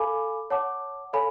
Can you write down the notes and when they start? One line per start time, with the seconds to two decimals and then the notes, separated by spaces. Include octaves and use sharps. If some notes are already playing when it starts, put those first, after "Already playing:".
Already playing: A4 F5 G#5 B5 D6
0.50 C#5 F#5 A5 D6
1.13 A4 C#5 F5 G#5 B5